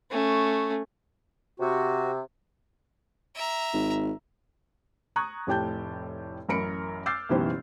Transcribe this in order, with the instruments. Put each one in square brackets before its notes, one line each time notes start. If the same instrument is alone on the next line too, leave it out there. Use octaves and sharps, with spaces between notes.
[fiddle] A3 C#4
[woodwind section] C3 [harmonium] F#4
[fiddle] E5 A#5
[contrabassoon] G#1
[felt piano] A#5 C#6 D#6 F#6 G#6
F1 A2 G4 G5 A5 G6
A1 F#2 A#4 B5 C#7 D7
D6 E6 F6 G6 A6 C7
F#1 B2 E3 D#4 G4 C5